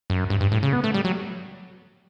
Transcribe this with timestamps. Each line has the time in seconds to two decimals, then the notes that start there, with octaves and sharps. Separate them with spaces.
0.10 F#2
0.30 G2
0.40 G2
0.51 A2
0.63 C#3
0.73 B3
0.84 A3
0.94 G3
1.05 F#3